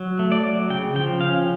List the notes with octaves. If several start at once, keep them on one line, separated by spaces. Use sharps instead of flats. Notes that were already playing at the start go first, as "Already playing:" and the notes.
Already playing: F#3
A3
D5
F#3
C#3 G5
F3 G5
C#4 F5